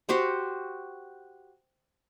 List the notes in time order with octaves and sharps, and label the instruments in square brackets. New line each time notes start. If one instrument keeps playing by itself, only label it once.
[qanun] F#4 G4 C5 F#5